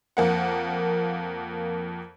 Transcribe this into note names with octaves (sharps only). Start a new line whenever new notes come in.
F2 A#3 F#5